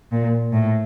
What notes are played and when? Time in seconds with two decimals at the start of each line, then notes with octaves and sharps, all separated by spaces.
0.12 A#2
0.53 A2